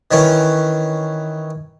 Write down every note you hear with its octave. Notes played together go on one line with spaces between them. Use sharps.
D#3 E3 C#4